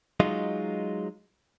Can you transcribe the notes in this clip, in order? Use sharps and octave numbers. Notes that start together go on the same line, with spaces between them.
F#3 G#3 D#4 F4